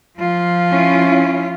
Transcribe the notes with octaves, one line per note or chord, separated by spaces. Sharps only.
F3 F4
C#4 E4